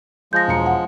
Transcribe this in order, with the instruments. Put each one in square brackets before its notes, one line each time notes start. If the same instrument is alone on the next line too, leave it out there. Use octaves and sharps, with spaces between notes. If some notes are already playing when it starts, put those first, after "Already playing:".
[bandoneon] F3 G#3 [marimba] G6 A#6
[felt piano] E1 A#5 C#7
[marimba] F#5